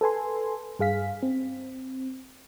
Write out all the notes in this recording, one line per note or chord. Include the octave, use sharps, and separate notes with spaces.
A4 B4 G#5 C6
G2 G#4 F5 B6
C4